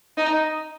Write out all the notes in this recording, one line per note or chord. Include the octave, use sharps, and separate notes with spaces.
D#4